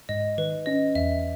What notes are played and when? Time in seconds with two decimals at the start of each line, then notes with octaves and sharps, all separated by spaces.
0.09 G#2 D#5
0.38 D#3 B4
0.66 C#4 D#5
0.95 E2 E5